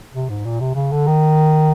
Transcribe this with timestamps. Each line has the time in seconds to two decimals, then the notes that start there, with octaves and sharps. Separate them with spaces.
0.14 C3
0.29 G#2
0.45 A#2
0.60 C3
0.75 C#3
0.92 D3
1.07 D#3